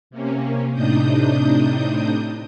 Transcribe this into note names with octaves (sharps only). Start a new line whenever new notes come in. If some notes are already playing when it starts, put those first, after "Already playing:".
C3 A#3 C#4
A2 C3 D4 D#4 D#6 G6